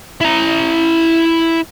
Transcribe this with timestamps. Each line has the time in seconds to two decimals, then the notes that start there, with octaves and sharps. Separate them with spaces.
0.21 E4 A#5